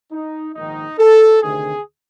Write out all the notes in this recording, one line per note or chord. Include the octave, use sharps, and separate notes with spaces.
D#4
A#1 G#2 D#3 D#4
A4
D2 C3 D#3 G#4